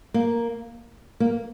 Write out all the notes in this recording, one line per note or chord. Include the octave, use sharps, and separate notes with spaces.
A#3
A#3